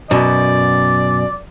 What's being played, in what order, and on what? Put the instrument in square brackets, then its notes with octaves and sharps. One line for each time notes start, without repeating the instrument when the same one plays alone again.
[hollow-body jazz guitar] F#2 B2 [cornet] D5